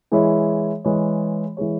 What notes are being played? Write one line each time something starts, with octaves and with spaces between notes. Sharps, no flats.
E3 G#3 E4 G#4 C#5
E3 G#3 E4 G#4 C#5
E3 G#3 E4 G#4 C#5